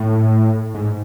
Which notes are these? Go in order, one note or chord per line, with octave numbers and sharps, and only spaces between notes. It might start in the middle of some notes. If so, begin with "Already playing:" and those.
Already playing: A2
G#2